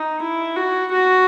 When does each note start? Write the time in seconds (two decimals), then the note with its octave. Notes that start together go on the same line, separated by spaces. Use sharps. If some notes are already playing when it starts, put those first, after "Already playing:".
Already playing: D#4
0.22 E4
0.56 F#4
0.92 F#4